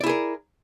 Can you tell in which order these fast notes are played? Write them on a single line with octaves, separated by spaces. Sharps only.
D5 E4 G#4 A#4